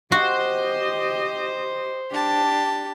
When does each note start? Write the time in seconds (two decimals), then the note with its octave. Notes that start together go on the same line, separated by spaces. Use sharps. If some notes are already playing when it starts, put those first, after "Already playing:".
0.12 F#4 G4 C5 D#5
2.11 D4 G4 A5